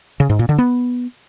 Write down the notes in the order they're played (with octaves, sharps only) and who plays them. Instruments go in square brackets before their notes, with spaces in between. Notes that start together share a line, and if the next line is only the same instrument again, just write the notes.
[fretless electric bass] C#3
G#2
A#2
D3
B3